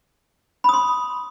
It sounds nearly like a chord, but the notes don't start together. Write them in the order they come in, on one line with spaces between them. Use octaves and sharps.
B5 D#6 C6